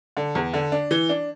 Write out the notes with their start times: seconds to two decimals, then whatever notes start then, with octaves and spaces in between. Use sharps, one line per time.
0.17 D3
0.35 E2
0.54 D3
0.72 D4
0.91 E3
1.09 D4